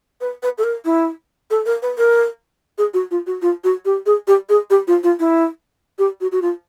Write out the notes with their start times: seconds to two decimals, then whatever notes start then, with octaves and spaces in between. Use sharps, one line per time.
0.20 B4
0.42 B4
0.58 A4
0.63 A#4
0.85 E4
1.50 A4
1.65 A#4
1.82 B4
1.97 A#4
2.78 G#4
2.93 F#4
3.10 F4
3.26 F#4
3.41 F4
3.63 F#4
3.85 G4
4.06 G#4
4.27 G4
4.49 G#4
4.70 G4
4.87 F4
5.03 F4
5.19 E4
5.98 G4
6.20 F#4
6.31 F#4
6.41 F4